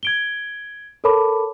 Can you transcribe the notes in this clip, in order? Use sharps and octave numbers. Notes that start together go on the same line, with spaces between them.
G#6 D7 G7
A4 A#4 C#5 A5 B5 D6